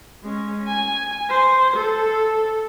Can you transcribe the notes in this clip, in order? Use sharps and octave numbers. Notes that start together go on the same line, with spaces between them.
G#3 C#4
G#5
C5
A4